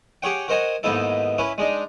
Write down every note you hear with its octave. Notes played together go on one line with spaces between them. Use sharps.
G4 G#4 C#5 F#5 G5
F#4 A#4 C5 D#5 F#5 G#5
D#2 G#2 B3 D#4 E4 A4
C#4 E4 B4
G#3 D4 D#4